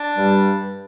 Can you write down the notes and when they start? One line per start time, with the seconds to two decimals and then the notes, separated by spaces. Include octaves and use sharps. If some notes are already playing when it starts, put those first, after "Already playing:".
Already playing: D4
0.16 G2 G3